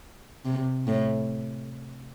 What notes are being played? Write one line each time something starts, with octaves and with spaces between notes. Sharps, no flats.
C3
A2